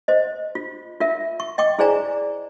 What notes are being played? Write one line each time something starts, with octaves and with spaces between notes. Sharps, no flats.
C5 D#5
F4
F4 A#4 E5
C#6
D#5 G5 C#6 D6
E4 G#4 C5 D5 G#5 A#5